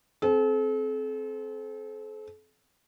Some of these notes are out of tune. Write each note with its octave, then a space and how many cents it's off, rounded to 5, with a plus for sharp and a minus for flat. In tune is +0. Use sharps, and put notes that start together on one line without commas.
C4 +0 A4 -40